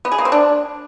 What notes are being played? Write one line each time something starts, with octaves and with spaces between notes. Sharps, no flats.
B3
G#4
A#3
C4
D4